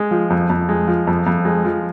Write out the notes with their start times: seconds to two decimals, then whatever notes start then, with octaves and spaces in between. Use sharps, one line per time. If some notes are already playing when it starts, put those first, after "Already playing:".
Already playing: G#3
0.11 F3
0.30 F2
0.50 F2
0.69 G#3
0.87 F3
1.07 F2
1.26 F2
1.45 G#3
1.65 F3